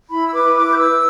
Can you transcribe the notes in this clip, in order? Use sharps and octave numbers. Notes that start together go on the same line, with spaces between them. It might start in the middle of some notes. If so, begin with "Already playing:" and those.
E4 B5
E6
B4 D6
E4 D6
G6
B4 E6